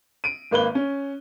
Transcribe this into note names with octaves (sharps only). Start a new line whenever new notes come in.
D7 D#7
G#1 A#3 B4 G7
C#4